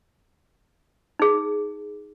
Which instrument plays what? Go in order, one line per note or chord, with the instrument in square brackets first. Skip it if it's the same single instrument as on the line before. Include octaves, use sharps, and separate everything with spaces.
[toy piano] D#4 G#4